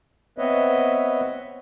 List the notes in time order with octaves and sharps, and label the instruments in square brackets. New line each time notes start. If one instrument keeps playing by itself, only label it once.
[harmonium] B3 C4 B4 C#5 D#5 E5